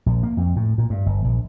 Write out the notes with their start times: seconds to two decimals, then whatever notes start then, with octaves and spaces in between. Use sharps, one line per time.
0.06 A#1
0.23 A#3
0.37 F2
0.56 A2
0.78 A#2
0.90 G2
1.06 G1
1.25 A#1